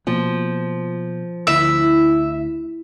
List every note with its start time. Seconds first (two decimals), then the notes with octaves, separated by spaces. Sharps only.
0.07 B2 F3 A#3 B3
1.47 D2 D3 E4 E5